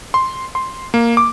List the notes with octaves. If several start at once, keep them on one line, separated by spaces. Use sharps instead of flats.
C6
C6
A#3
D6